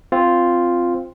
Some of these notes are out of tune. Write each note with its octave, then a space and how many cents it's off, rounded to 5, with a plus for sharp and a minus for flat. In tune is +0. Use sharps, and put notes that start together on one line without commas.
C4 +0 F4 +0